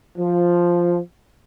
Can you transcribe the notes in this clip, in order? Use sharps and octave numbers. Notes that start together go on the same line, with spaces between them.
F3